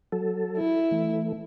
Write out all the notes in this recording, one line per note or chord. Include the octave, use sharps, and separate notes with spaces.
F#3 A4
E4
E3 A3